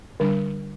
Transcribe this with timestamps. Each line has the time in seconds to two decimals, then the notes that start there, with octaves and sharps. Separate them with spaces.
0.20 D3 G3 D4